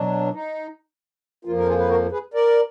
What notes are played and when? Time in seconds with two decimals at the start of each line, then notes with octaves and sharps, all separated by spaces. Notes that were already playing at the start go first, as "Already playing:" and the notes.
Already playing: B2 F#3 D4
0.34 D#4
1.45 F2 F3 A#3 F4
1.57 A#4
1.67 F4 G#4
1.78 B4
1.89 F#4 A#4
2.11 G#4 B4
2.34 A#4 D5